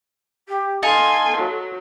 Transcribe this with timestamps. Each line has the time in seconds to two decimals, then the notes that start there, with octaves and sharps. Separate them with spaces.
0.48 G4
0.83 D#4 A4 F5 G#5 A5 C6
1.37 F#3